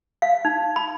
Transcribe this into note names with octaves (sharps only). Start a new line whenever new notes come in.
F5
D#4
B5